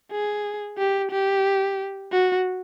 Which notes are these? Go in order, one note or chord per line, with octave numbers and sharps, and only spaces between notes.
G#4
G4
G4
F#4